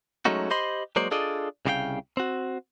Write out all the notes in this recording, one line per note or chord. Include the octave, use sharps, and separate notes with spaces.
F#3 G#3 A3 C#4 D#4 F#4
G4 C5 D#5 B5 C6
F#3 G#3 A#3 C5 D5
D4 F4 G#4 A4 D5 D#5
C2 C#3 F#4 G4 F5 G5
C4 F#4